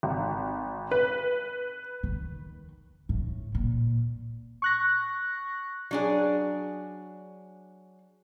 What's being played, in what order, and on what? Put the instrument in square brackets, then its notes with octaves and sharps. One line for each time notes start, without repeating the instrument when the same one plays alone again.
[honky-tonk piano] G#1
B4
[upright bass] D#3
A2
A#2
[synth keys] C#6 F#6 A#6
[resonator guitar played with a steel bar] F#3 D4 G#4